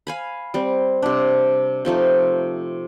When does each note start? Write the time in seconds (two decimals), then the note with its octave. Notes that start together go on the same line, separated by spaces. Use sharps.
0.07 F5 G#5 B5
0.54 G3 C4
1.02 C3 D4
1.85 C3 F3 A3 D#4